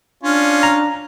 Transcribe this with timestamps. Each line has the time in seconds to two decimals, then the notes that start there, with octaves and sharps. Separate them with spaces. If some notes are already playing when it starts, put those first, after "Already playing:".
0.23 C#4 D4 F4
0.63 A#5